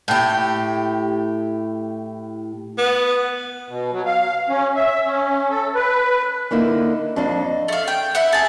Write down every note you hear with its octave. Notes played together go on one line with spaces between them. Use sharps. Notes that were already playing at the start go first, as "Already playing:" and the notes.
A2 G4
B3
B2
F#3
F5
C#4
E5
C#4
A4
B4
D3 A#3 D#4 E4
F2 D4 D5 D#5 F5
A3 F5
G5
E4 E5 F#5
G#4 A5